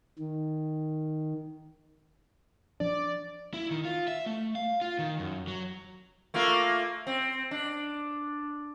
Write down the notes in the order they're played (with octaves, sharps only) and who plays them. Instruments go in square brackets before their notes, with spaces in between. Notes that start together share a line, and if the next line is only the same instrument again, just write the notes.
[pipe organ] D#3
[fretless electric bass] F3 D4 [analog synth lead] D5
[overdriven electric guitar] E4
D#3
F4
E5
A3
F5
F4
D#3
F#2
F#3
[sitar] A3 A#3 F4
C4
D4